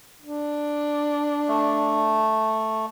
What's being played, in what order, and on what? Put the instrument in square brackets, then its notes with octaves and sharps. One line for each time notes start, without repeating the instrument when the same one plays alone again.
[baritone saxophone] D4
[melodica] A3